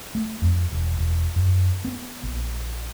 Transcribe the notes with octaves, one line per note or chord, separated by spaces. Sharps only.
A3
F2
E1
E1
F#2
B3
A#1